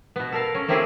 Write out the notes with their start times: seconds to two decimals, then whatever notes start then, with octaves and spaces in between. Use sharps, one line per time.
0.16 B2 B3
0.32 A4 A#4 F5
0.55 C#4
0.68 A3 A#3 C4 E4 G4 G#4